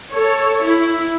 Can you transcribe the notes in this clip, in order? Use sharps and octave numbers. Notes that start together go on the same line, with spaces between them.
A4 C#5
E4